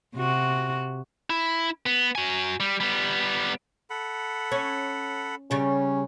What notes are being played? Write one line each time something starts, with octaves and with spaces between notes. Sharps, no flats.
C3 F#4
E4
B3
F#4 G#5
G3
G3 B3
A4 F#5 B5
C#4
C#3 G3 C#4